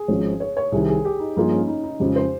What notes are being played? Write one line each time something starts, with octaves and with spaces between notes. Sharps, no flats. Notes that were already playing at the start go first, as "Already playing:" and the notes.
Already playing: G#4
G#1 G#2 F3 G#3 C#4
C#5
C#5
C2 C3 D#3 G3 G#4
G#4
G4
D#4
G2 F3 A#3 D#4 F4 G#4
C#4
D#4
D#4
F2 C#3 F3 G#3 G4
C5